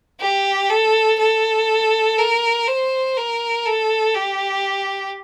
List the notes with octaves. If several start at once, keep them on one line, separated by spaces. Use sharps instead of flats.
G4
A4
A4
A#4
C5
A#4
A4
G4